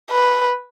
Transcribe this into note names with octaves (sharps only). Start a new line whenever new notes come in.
B4